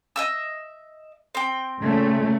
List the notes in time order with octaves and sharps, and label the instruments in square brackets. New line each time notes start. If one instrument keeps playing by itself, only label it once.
[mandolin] D#5 E5 E6
C4 G5
[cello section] A#2 C#3 A3